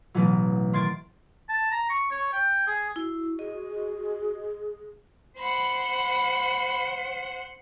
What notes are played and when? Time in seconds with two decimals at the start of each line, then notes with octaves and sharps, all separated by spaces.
0.14 A1 B2 E3 F#3
0.73 D#3 C6 G#6 A6 D7
1.49 A5
1.71 A#5
1.90 C#6
2.11 C#5
2.33 G5
2.67 G#4
2.96 E4 F#4
3.39 G#4 D#5
5.39 C5 F#5 B5